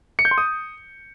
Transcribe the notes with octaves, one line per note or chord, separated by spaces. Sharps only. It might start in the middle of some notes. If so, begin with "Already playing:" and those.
C#7
G6
C6
D#6